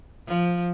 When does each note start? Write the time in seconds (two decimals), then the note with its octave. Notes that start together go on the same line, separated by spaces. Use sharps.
0.28 F3